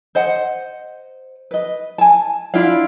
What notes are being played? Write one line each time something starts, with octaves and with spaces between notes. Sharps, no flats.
C5 D#5 F#5
B4 D#5
G#5 A5
D4 E4 F4 F5